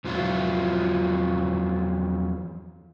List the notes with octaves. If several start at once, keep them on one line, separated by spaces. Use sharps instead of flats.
E2 F3 F#3 F4 E5